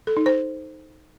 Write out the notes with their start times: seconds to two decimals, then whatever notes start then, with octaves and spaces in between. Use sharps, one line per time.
0.07 A4
0.17 D#4
0.26 C5